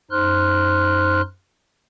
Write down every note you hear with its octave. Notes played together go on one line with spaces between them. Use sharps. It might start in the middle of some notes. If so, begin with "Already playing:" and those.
F#2 D#4 C5 C6 F6 F#6